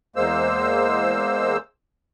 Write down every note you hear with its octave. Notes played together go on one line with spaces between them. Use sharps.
E2 G#3 A#3 C5 E6